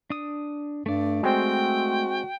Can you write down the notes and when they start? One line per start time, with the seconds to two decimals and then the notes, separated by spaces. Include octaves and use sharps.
0.10 D4 D#6
0.86 G2 A3 D5
1.23 G#3 C4 F#4 G5